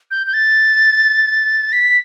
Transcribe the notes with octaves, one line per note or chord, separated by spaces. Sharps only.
G6
G6
A6
B6